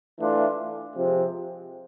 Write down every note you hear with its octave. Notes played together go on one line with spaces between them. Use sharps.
E3 A3 D4 F4
C3 F3 G#3 C4